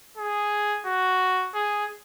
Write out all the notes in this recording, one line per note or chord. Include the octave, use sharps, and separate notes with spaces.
G#4
F#4
G#4